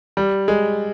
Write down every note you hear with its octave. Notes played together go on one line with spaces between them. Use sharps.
G3
G#3